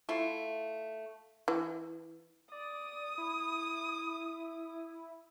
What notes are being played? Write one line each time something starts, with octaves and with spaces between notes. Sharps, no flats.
A3 E4 F4
E3
D5 D#6
E4